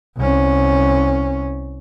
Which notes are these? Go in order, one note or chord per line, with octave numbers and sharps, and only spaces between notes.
C2 C#4